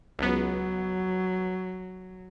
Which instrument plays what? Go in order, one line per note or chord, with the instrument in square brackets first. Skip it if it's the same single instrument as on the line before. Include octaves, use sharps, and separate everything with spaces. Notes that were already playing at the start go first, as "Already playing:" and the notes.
[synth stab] C#2 B3 [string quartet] F#3